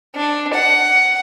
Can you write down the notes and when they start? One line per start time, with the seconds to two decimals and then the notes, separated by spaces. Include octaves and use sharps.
0.15 D4
0.53 F#5